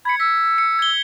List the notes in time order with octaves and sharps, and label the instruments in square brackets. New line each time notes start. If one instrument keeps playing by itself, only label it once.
[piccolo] B5 [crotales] G#6 C#7
[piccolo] E6 [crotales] B6
[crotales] C#7
G#6 G7